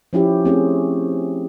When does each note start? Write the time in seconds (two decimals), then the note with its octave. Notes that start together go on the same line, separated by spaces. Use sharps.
0.13 F3 C#4 E4 G4
0.44 A3 C4 C#4 G#4